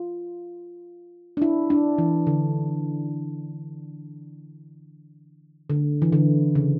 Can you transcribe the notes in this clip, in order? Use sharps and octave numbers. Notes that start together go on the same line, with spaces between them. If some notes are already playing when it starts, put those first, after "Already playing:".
Already playing: F4
D4
E4
D4
E3
D3
D3
E3
D3
C#3